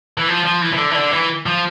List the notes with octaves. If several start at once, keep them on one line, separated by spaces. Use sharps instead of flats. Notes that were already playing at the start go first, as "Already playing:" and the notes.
E3
F3
F3
E3
E3
D3
E3
D3
E3
F3